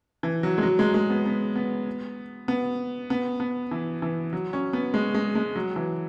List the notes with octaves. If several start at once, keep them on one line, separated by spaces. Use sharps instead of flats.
E3
F#3
G#3
F#3
G#3
G#3
B3
B3
B3
B3
B3
B3
E3
E3
F#3
C#4
B3
G#3
G#3
G#3
F#3
E3